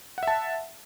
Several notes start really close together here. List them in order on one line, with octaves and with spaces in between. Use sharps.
F#5 E5 A5